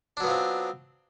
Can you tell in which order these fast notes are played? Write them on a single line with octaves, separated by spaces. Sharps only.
D4 F#3 B3 F4 C4